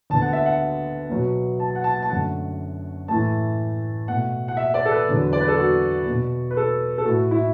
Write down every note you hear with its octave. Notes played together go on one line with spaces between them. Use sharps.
D2 D3 B3 A5
F#5
E5
F#5
B2 F#3 B3
A5
F#5
A5
A5
F#2 D3 A3 F#5
A2 E3 A3 A5
B2 A3 F#5
F#5
E5
D5
A4
B4
E2 D3 F#3
D5
B4
A4
F#4
B2 B3
B4
A4
A4
A2 A3 F#4
E4